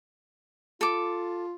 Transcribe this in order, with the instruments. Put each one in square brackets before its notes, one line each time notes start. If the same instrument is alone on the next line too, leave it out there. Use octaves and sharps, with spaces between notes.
[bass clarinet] F4 [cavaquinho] A4 D6